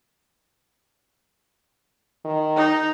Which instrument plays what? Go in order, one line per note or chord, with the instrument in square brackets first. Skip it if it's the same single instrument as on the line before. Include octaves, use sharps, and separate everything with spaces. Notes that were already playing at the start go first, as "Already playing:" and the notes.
[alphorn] D#3
[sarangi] D#4